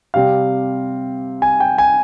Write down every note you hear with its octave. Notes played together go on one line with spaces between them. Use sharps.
C3 G3 C4 F5
G#5
G5
G#5